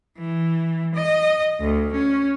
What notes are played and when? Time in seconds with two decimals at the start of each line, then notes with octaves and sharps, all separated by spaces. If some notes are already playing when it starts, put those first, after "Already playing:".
0.18 E3
0.95 D#5
1.60 D2
1.93 C#4